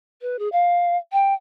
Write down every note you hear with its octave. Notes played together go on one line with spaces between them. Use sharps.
B4
G#4
F5
G5